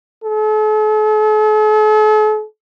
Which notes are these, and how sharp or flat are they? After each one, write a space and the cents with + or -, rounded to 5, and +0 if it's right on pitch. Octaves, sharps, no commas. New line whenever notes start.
A4 -45